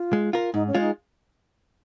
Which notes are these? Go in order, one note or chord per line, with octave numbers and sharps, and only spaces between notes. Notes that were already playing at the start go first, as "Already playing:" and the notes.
Already playing: F4
G#3
F4 A#4
G#2 D#4
C#4
G#3 F4 G#4
D#4